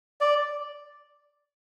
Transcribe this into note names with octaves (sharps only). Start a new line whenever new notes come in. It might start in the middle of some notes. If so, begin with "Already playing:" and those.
D5